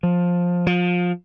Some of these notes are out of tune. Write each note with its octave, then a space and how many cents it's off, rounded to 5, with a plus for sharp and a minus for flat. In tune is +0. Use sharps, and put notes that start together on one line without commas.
F3 +15
F3 +25